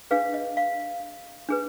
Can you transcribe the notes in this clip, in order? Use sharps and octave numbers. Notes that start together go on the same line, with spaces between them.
D4 G#4 B4 F5
D#5
F5
D4 G#4 B4